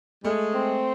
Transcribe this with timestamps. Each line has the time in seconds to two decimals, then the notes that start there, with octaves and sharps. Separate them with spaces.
0.24 G#3 A3
0.53 C4